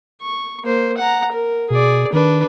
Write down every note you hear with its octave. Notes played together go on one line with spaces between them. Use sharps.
C#6
A#3 C5
F#5 A#5
A#4
B2 G#4 D5
D#3 D4 B4